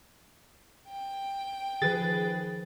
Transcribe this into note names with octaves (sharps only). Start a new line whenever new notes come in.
G5
D#3 F3 G#4 B4 A6